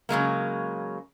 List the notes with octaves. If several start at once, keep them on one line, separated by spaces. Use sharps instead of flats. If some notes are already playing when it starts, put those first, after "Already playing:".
C#3 F#3 G#3 A#3